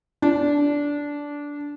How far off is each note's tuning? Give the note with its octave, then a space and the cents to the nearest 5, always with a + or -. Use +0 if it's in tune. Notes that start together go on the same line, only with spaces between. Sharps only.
D4 -15